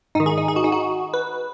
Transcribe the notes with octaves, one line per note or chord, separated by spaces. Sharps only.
G#2 D#3 D#4
G#4
D#4
G#4
F#4
D#4
F#4
B4